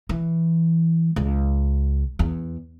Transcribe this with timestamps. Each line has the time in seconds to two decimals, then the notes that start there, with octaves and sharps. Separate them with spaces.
0.09 E3
1.16 C#2
2.19 E2